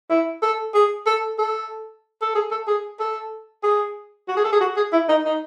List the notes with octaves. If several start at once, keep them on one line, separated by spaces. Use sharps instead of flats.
E4
A4
G#4
A4
A4
A4
G#4
A4
G#4
A4
G#4
F#4
G#4
A4
G#4
F#4
G#4
E4
D#4
D#4